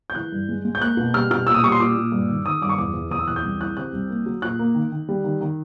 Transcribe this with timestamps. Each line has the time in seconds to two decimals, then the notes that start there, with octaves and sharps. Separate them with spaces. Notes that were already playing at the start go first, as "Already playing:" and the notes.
0.10 G6
0.15 E3 F#6
0.32 G2
0.49 G#3
0.65 G#3
0.75 G6
0.81 A#3 F#6
0.97 B2
1.14 G3 F6
1.31 B2 F6
1.47 A#2 E6
1.54 D#6
1.63 G3 C#6
1.72 C6
1.79 A#2 D6
1.96 A#2
2.12 G2
2.29 D#3
2.45 D#3 D#6
2.61 G2 D6
2.69 C#6
2.78 E2 D6
2.94 E2
3.11 E2 D#6
3.19 E6
3.27 E2 F#6
3.36 G6
3.43 C2
3.61 E3 F#6
3.77 C3 F#6
3.93 C2
4.10 A#3
4.26 F#3
4.42 A#2 F#6
4.59 A#3
4.75 D#3
4.92 D#3
5.09 G3
5.24 D#3
5.41 D#3